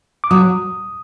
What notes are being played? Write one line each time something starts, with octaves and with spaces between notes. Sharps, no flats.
D6
F#3 D#6